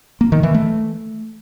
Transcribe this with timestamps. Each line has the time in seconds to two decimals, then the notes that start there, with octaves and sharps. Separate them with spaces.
0.21 A#3
0.32 D#3
0.43 E3
0.54 A3